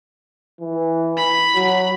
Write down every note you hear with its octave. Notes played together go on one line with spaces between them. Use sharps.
E3
B5
F#3